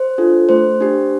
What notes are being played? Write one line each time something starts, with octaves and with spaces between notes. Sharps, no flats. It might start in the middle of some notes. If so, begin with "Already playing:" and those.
Already playing: C5
D4 F4 A4
A3 C5
D4 G4